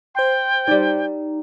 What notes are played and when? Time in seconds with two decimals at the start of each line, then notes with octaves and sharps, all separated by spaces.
0.15 C5 G5 C6
0.67 G3 D#4 D5